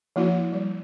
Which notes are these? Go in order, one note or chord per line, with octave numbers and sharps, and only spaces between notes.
F3 A#3 E4 F#4
G3